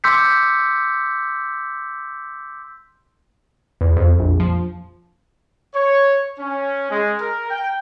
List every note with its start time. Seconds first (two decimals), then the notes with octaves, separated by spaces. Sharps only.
0.04 C6 D6 E6 G6 B6 C#7
3.81 E2
3.97 F2
4.20 A#1
4.40 F3
5.74 C#5
6.40 C#4
6.90 G#3
7.20 A#4
7.49 G5